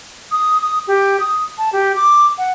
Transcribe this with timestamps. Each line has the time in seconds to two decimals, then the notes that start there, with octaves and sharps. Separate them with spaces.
0.32 D#6
0.62 D#6
0.87 G4
1.20 D#6
1.58 A5
1.73 G4
1.96 D6
2.38 F#5